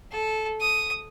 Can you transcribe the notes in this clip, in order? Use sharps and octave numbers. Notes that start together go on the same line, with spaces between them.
A4
D#6